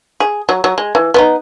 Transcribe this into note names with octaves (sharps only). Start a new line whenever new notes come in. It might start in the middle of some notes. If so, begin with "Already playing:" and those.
G#4
F#3
F#3
G#3
E3
B3 C4 D#4